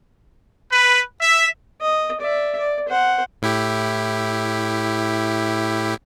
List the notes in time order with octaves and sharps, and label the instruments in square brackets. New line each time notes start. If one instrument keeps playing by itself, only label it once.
[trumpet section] B4
E5
[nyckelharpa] D#5
D5 E5
D5
C5 F#5
[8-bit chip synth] A2 E4 G4